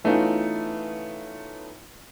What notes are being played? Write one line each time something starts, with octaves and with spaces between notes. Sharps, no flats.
E3 A3 B3 C#4 D#4 F4